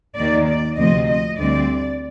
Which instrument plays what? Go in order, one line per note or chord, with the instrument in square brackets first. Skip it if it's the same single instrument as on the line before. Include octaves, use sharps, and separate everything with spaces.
[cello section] D#2 D#3 A#3 D5
D5
D2 C3 F3 C4 D#5
D#5
D2 D3 G3 C4 D5